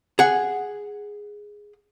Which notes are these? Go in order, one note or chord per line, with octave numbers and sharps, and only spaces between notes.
G#4 F#5